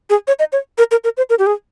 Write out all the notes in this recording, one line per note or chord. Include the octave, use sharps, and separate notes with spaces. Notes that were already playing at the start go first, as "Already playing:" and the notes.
G#4
C#5
D#5
C#5
A#4
A#4
A#4
C5
A#4
G4
G#4